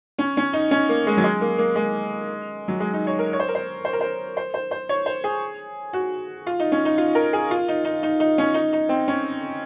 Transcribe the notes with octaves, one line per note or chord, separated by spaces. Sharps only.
C#4
C#4
D#4
C#4
A#3
G#3
F#3
G#3
A#3
A#3
G#3
F#3
G#3
D#4
C#5
A#4
C#5
C5
A#4
C5
C5
A#4
C5
C5
C5
C5
C#5
C5
G#4
F#4
F4
D#4
C#4
D#4
F4
A#4
G#4
F4
D#4
D#4
D#4
D#4
C#4
D#4
D#4
C4
C#4